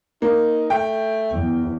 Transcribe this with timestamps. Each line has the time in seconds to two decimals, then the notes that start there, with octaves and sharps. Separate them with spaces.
0.22 A#3 D#4
0.70 A3 G5
1.34 E2